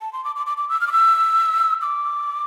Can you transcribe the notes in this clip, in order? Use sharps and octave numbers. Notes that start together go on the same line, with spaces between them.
A5
C6
D6
D6
D6
D6
E6
F6
D6
E6
D6